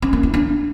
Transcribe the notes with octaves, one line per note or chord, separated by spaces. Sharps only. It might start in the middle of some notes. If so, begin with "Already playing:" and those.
C#4
A#3
E4
D4